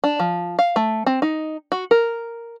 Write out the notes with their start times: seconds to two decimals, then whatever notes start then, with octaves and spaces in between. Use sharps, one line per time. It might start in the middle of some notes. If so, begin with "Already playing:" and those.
0.04 D4
0.19 F3
0.59 F5
0.76 A3
1.06 C4
1.22 D#4
1.72 F#4
1.91 A#4